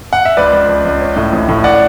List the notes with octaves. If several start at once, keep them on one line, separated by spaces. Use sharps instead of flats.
F#5
E5
C#2 B4 D5
C#2
C#2
C#2
C#4
A2
A1
A2
D5 F#5